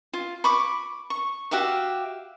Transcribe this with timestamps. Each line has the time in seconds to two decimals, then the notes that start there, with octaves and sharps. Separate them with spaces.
0.13 F4
0.44 B5 C#6 D6
1.10 C#6
1.51 F#4 G4 E5 F5